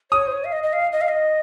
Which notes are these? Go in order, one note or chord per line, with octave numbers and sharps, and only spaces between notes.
C#5 D#6
C5
C#5
F5
D#5
D#5
F5
D#5
F5
D#5